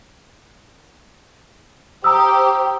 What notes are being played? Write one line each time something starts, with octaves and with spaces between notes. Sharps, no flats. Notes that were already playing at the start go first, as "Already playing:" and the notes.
G4 C5 A#5 D#6 E6